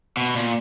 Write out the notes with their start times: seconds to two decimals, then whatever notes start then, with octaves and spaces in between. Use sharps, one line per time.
0.17 B2
0.35 A#2